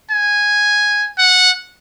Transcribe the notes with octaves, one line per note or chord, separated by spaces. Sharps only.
G#5
F#5